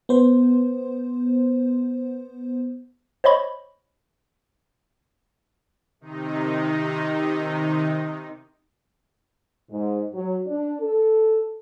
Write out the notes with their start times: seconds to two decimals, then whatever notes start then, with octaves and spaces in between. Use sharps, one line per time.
0.09 B3 C5
3.24 C5 C#5 D#5 B5 C#6
6.01 C3 D#3 D#4
9.71 G#2
10.14 F#3
10.47 D4
10.80 A4